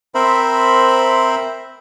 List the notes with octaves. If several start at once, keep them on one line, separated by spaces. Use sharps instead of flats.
C4 A#4 C5 E5 B5